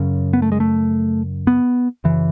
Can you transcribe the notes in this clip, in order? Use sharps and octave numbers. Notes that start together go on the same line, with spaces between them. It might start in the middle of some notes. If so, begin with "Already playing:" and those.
Already playing: F#2 C#3
B3
A3
G#3
A3
B3
F#2 C#3 E3